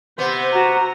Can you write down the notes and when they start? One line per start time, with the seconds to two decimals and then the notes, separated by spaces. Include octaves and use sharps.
0.18 C3 B3 C5
0.53 F#4 A#5